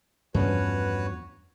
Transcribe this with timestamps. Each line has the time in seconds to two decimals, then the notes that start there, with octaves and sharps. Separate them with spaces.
0.34 E2 G2 F3 A3 C#4 F#4 B4 C#5